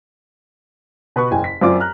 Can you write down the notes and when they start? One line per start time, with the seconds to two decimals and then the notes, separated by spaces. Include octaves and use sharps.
1.16 B2 B4 B5 C#6
1.31 F#1 E2 G5 G#5
1.44 B6
1.61 F#2 C4 F4 D5 D6
1.80 A#5 F6 F#6